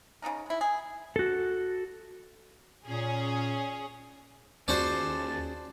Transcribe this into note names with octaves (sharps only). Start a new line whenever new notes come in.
C#3 F#3 D#4 A#4
G#3 E4
G#4
F#4 A4
A#2 C#4 G#4
D#2 C#4 F4 F#4 G#4 C5 D5 A5